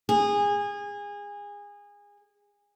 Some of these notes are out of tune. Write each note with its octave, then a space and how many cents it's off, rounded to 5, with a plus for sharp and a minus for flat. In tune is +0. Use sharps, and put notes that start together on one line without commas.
G#4 -25